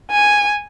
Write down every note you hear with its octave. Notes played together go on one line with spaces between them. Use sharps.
G#5